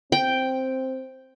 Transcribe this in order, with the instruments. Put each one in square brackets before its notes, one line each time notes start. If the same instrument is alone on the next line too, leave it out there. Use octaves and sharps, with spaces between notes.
[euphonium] C4 [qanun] G5